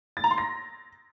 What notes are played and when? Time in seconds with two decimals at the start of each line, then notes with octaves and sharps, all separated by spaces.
0.17 A6
0.24 A#5
0.31 C6
0.38 A#6